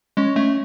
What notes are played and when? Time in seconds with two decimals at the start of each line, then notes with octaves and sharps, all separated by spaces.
0.17 G#3 C#4
0.36 A3 C#4